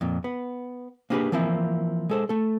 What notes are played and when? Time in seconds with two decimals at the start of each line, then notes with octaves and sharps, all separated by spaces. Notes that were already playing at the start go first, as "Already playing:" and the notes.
0.01 F2 A#2
0.24 B3
1.10 A#3 B3 D4 G4 G#4 B4
1.32 E3 F3 A#3 C4 E4
2.09 G#3 A4 C5
2.29 A3 A4